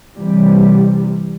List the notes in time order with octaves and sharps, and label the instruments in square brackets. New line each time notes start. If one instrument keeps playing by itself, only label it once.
[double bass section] C3 E3 G3